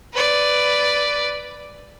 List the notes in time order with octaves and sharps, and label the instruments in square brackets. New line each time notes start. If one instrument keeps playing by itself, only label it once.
[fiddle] B4 D5